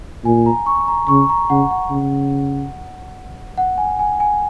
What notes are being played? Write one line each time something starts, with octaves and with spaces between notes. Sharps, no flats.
A#2 G#5
A#5
C#6
A#5
C#3 C#6
A#5
C#3 F#5
F#5
C#3
F#5
G#5
G#5
G#5